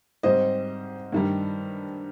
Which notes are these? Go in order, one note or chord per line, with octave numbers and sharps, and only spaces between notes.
G#2 G3 C4 C5 D#5
G2 D#3 G3